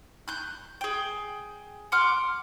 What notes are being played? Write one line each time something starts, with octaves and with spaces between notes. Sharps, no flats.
F#6 G6
G#4 G5
F#5 C6 D6 F6